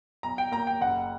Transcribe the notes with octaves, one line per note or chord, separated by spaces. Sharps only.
B1 A#5
G5
A#3 A#5
G5
F#1 F#5